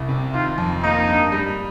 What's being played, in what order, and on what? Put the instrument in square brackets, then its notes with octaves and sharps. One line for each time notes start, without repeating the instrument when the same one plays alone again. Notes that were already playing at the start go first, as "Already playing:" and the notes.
Already playing: [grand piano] C2
C3
[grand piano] D#3 [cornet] F4
[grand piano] F2
[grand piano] A#3 [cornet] D#4
[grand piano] G2
G3